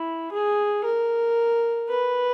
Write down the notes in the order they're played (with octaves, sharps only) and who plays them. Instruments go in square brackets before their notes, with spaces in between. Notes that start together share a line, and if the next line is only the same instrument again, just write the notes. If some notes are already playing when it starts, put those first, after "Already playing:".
Already playing: [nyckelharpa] E4
G#4
A#4
B4